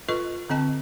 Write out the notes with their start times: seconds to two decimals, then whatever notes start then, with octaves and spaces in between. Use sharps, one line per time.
0.09 F4 A4 B4 D#5 C#6
0.50 D3 C4 D#5 A5